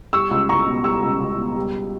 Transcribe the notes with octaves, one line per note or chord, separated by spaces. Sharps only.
G3 C#6 E6
C#2
C#2 A#5 C#6
B2
G3 C#6 E6
C#2
C#2
B2
G3